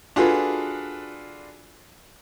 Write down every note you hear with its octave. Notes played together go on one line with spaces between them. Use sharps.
D4 F4 F#4 G#4 A4 B4